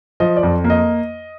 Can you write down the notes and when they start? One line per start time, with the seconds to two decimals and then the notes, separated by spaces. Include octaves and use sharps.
0.20 F3 D#5
0.37 D5
0.43 F2
0.64 A#3
0.70 D#5